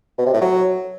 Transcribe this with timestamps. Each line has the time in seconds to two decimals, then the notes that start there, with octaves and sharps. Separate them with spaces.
0.18 B2
0.26 C3
0.33 A2
0.41 F#3